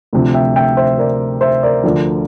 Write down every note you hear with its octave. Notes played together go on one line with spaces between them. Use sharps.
D2 C3 F3
E5 G5
E5 G5
C5 E5
A#4 D5
C5 E5
A#4 D5
D2 D3 F3